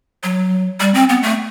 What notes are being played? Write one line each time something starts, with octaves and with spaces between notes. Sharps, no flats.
F#3
G3
C4
B3
A3